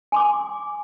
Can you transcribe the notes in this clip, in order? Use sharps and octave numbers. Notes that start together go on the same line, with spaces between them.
G#5 C6 D6